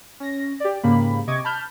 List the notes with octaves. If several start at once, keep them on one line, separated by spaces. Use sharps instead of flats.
C#4 A#6
G4 D5
G#2 C#3 A#3 G4 B5
C3 D#5 C#6 D6 G#6
A5 B5 F6 G6